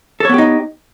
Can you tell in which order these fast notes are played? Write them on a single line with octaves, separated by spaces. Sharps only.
A4 C#5 B3 G4 D#4